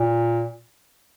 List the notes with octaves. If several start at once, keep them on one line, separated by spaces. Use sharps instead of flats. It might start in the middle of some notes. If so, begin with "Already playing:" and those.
Already playing: A#2